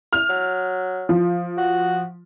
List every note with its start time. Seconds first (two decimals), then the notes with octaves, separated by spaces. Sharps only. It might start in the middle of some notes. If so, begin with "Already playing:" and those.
0.13 F6
0.29 F#3
1.09 F3
1.57 F#4